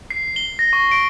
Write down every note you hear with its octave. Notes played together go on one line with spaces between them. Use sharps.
C7
G7
A#6
C#6
D7